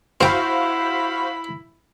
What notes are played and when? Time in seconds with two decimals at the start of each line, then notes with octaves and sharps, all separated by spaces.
0.21 C4 E4 F#4 C5 F5 G5 B5